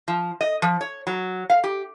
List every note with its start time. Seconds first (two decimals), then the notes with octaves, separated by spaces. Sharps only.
0.08 F3
0.41 D#5
0.62 F3
0.81 C#5
1.07 F#3
1.50 F5
1.64 G4